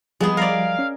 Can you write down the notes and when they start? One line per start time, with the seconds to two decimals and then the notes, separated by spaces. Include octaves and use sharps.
0.21 F3 G3 G#3 B3 G#4
0.37 A#4 D5 F5
0.79 C#4